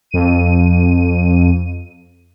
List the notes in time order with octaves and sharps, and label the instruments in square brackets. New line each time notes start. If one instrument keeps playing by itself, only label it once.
[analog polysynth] F2 D#7